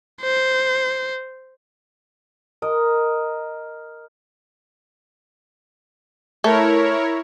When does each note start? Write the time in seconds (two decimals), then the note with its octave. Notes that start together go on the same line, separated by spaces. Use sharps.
0.21 C5
2.62 A#4 D#5
6.44 A3 E4 A#4 C#5